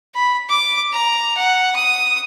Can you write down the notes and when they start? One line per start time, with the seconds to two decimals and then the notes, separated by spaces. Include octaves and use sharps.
0.15 B5
0.49 D6
0.92 A#5
1.37 F#5
1.76 D#6